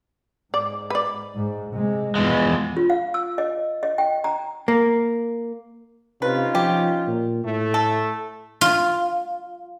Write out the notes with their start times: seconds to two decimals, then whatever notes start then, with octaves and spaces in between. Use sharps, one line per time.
0.54 G#2 D5
0.90 B4 D5
1.35 G#2
1.74 C3 G#3
2.15 E2 G2 F3 G#3
2.77 F4
2.90 F5
3.14 E6
3.38 D#5
3.83 D#5
3.98 G5
4.24 A#5
4.68 A#3
6.22 C3 C#4 D#4 F4 B4
6.55 F3 G4
7.07 A#2
7.45 A2 A3
7.74 A4
8.61 F4